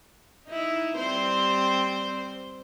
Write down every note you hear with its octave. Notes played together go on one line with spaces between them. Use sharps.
D#4 E4
G3 C4 C5